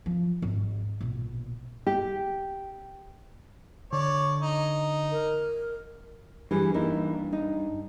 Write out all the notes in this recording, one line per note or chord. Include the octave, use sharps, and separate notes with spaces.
F3
G#1 D#2
A#1 B2
G4
D3 C#5 D5
D#4
A#4
G2 E3 G3 G#4
E3 A#3 D#4
D#4